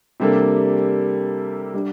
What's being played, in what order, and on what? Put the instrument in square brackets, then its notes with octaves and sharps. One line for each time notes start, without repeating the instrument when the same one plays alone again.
[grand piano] C3 G3 A#3 D4 A4
G3 D4